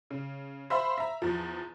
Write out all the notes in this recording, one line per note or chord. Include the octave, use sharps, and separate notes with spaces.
C#3
C5 E5 F5 B5 C6
E5 A#5
E2 F3